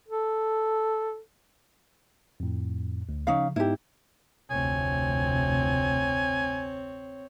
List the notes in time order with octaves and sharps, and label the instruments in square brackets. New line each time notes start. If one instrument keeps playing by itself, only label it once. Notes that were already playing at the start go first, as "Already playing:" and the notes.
[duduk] A4
[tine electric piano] F2 A2
D2
[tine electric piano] C#3 F3 [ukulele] C#4 D#4 F5
[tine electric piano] G#2 B3 D#4 [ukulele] E4 G4
[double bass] F1 D2 [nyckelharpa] C4 C#5 [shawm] G#5